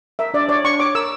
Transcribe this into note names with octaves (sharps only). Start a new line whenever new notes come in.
A#4 E5
D4 D5
C#5 D5
D4 C#6
C#5 D6
A#4 E6